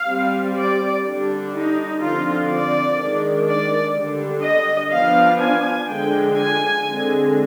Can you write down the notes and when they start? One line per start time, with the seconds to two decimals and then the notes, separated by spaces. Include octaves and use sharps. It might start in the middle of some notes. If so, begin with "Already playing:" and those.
Already playing: F5
0.09 G3 C4
0.57 D5
1.05 D3 G3 D4
1.54 D#4
2.01 D3 F3 C4 F4
2.50 D5
2.99 D#3 G#3 D4
3.47 D5
3.95 D3 G3 D4
4.43 D#5
4.91 F3 B3 D4 F5
5.39 G#5
5.88 D3 F3 G#3 D4 G5
6.36 G#5
6.85 D3 G#3 C4